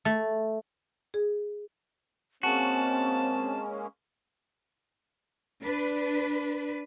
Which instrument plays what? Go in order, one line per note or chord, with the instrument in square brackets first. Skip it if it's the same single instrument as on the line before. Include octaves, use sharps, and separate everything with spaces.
[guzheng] A3
[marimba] G#4
[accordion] G#3 A#3 C#4 [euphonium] C4 [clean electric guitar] F#4 [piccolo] A5
[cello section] D4 B4